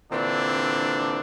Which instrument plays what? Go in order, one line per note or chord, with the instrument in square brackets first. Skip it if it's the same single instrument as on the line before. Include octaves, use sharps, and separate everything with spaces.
[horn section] A#2 D3 E3 C4 D4